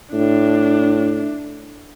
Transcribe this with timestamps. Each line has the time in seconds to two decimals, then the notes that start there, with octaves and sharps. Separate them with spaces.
0.13 A2 D4